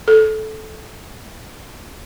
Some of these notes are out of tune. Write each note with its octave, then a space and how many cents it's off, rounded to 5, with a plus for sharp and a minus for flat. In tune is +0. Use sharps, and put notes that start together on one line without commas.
A4 -15